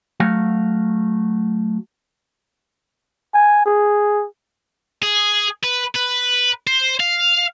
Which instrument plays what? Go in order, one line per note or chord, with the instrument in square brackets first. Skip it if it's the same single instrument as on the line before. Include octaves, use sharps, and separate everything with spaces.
[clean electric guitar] F#3 A3 F#4 F5
[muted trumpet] G#5
G#4
[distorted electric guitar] G#4
B4
B4
C5
F5